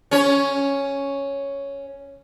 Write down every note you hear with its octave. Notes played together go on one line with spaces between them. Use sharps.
C#4 C#5